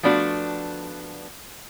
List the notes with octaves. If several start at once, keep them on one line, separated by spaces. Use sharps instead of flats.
F3 A3 B3 D4 F#4